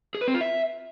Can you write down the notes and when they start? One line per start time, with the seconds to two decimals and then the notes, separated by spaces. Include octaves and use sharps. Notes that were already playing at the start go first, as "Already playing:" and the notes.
0.15 G#4
0.21 B4
0.28 C4
0.34 F4
0.41 E5